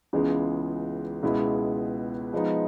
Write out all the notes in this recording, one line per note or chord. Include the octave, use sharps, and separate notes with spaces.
C#2 C#3 E3 G#3 B3
C#2 B2 G#3 B3 E4
F3 G#3 B3 D#4